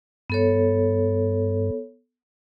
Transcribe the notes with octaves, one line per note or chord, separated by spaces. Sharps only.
G2 B3 A4 C#5